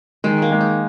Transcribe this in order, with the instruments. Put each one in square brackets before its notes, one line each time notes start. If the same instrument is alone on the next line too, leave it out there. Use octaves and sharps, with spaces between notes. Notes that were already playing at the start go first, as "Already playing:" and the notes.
[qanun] D#3 [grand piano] G#3
[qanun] A#3
[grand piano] G#3
[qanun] D#4